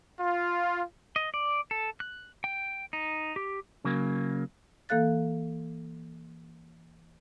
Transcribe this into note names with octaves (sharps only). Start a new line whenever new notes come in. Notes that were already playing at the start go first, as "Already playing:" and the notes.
F4
D#5
D5
A4
F#6
G5
D#4
G4
C#3 F#3 A#3
E3 A#3 A4 F5 F#6 A6